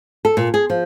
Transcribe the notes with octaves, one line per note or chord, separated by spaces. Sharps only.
A4
A#2
G#4
F3